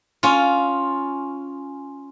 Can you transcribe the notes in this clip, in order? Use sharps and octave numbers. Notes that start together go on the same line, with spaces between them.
C#4 F4